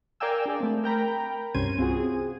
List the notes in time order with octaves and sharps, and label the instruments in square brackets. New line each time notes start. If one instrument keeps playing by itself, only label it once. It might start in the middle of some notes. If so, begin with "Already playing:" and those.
[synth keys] A#4 D5 F5 G5 G#5 E6
D4 G#4 D5
A3 C4
A#4 G5 A#5 B5
C2 G2 C#4 C5 G#6 D#7
C4 F4 F#4 G#4